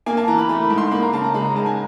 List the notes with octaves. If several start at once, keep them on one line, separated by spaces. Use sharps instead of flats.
A#3 G#5
A5
E3 A#5
B5
A3 B5
B5
G#2
C6
A#3 B5
A#5
C#3 A5
A#5
G#3 B5
A#5
G#2 A5
G#5